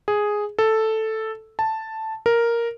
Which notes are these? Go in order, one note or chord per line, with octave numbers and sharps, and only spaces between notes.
G#4
A4
A5
A#4